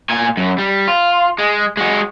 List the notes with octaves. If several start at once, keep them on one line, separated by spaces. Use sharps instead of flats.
A#2 G#5
F#2
G3
F4
G#3
G#3 F#4